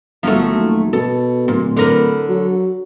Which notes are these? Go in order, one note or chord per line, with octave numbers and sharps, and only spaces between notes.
G1 F3 F#3 A3
D#1
B2 A4
D1 A#2
D3 A#4 B4
F#3